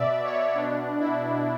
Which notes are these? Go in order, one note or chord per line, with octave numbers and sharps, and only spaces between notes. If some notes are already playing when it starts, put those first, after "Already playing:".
Already playing: B2 D5 E5
C#5
B2 D4
E4